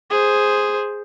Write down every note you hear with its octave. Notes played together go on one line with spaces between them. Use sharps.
G#4 C5